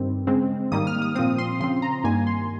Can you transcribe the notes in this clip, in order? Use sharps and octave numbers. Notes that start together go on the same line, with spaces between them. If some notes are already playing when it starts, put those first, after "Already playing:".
Already playing: G2 D#3 G3 C4
C#3 G#3 C4
G#2 D#3 G3 A#3 D#6
F6
D#6
A#2 F3 C4 D#6
C6
C#3 F3 C4 C6
A#5
G2 D#3 G3 A#3 G#5
C6